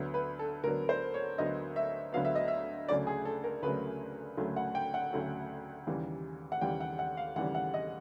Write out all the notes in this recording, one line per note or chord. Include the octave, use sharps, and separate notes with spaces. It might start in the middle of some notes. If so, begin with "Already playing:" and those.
Already playing: D2 D3 F#3 B3
B4
A4
D2 D3 F#3 B3 A#4
C5
C#5
D2 D3 F#3 B3 D#5
E5
D2 D3 F#3 B3 F5
E5
D#5
E5
D2 C#3 F#3 A3 D5
G#4
A4
A#4
D2 C#3 F#3 A3 B4
D2 C#3 F#3 A3
F#5
G5
F#5
D2 C#3 F#3 A3
D#2 C#3 E3 G3
F#5
D#2 C#3 E3 G3 G5
F#5
F#5
F5
D#2 C#3 E3 G3 F#5
F#5
D#5